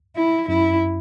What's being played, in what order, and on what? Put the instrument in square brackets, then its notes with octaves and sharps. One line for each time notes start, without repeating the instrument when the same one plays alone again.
[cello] E4
[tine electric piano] F#2 [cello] E4